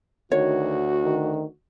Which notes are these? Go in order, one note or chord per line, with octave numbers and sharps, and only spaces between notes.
D2 D#3 F#4 C#5
D#3